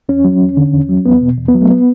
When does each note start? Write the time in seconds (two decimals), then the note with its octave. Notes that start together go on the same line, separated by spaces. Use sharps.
0.09 E2 C#4
0.25 F#3
0.42 E2
0.57 D3
0.73 E2
0.89 F#3
1.05 E2 B3
1.22 B2
1.38 E2
1.49 B3
1.54 F#3
1.62 A3
1.70 B3